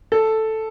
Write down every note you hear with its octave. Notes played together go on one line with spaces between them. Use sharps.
A4